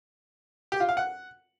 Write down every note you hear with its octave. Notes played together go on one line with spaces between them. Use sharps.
G4
F4
F5
F#5